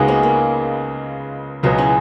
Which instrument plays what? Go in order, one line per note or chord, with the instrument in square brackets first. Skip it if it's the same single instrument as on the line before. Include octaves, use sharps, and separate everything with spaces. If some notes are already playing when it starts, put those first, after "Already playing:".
Already playing: [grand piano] C#2 C#3 G#3 B3 [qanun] D#4 F#4 G#4 A#4
[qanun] A#3 C#4
A#3
[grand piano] C#2 B2 F#3 B3 [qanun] G#3
[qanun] C#4 E4